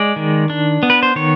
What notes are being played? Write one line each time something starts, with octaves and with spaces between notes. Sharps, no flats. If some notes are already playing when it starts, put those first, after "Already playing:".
Already playing: G#3 D5
D#3
D4
B3
B4
C5
D#3 C#5